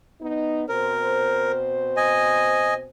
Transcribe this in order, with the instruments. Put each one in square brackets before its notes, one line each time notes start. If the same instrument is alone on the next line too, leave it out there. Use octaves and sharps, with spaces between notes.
[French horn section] B3 D#4
[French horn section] B2 C4 C5 [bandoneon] A#4
[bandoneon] D#5 G#5